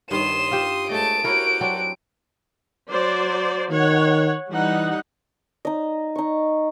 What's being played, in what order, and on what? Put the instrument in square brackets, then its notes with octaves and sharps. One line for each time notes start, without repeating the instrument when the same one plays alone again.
[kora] G2 D#3 [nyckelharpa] C6 D#6 [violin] E7
[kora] F4 G4
[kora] G#3 C#5 D#5 [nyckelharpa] A3 A5 [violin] D7
[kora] E4 A#4 C#5 [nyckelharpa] F#4 G4
[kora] F#3 C4 D4
[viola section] F#3 C5 D5
[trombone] D#3 [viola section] C#5 F#5
[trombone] E3 [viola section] G3 D#4 F#5
[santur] D#4 D#5
D#4 C#6